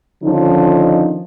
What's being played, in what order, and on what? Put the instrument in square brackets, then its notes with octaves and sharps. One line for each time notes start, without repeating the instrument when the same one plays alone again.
[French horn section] D3 D#3 F3 C#4 D#4